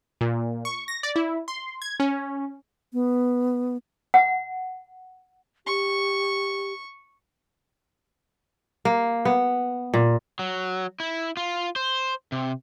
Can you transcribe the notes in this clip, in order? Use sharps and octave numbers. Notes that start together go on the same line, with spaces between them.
A#2
C#6
A#6
D5
E4
C6
G#6
C#4
B3
F#5
G4 C#6
A#3
B3
A#2
F#3
E4
F4
C5
C3